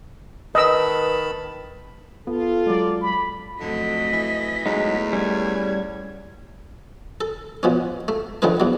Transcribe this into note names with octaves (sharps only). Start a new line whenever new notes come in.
D#3 B4 D#5 A5 B5 E6
B3 F4 A4
F#3 G#3 D5
B5
F2 D3 F#3 A3 D#5 B6
E3
E2 F#3 G#3 A3 D#4
G3 C#4 G#6
A4
B2 F3 C#4
A3
D3 D#3 F3 A3 C#4 B4
E2 F#3